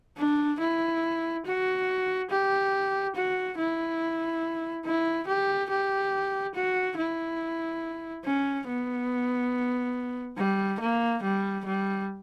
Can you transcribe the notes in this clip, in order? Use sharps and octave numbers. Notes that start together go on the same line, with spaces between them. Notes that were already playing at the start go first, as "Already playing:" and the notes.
D4
E4
F#4
G4
F#4
E4
E4
G4
G4
F#4
E4
C#4
B3
G3
A#3
G3
G3